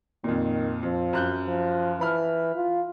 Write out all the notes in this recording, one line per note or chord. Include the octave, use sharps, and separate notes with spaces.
F2 A#2 D#3
F2 F3
F#2 F#6 G6
F3
E3 A5 B5 F6
F4